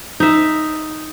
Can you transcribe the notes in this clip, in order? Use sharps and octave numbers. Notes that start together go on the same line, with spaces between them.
D#4 E5